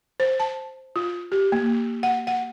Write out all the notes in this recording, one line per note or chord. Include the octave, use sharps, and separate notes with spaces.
C5
A5
F4
G4
A#3
F#5
F#5